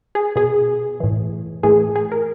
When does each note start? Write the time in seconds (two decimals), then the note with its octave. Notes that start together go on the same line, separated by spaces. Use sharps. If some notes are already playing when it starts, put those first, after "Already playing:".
0.15 G#4
0.36 B2 G#4
1.00 A2 E3
1.63 A2 E3 G#4
1.96 G#4
2.12 A#4